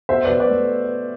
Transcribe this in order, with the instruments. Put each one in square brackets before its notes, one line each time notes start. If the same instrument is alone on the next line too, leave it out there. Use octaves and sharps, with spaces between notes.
[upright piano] B2 C5 E5
B2 B4 D5
B4 D5
A3